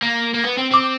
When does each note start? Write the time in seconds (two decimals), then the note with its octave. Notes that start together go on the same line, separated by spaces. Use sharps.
0.03 A#3
0.35 A#3
0.45 B3
0.59 C4
0.72 C4 D6